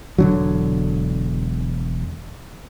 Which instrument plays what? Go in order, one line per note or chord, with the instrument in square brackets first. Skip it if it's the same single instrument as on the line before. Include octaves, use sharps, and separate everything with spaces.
[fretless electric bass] E1 D3 F#3